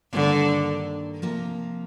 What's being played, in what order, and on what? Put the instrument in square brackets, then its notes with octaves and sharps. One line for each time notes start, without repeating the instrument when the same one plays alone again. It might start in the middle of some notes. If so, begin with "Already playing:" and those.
[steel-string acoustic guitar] G2 D#3 A#3 [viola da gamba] D3
[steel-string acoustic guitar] C3 F3 A#3 F4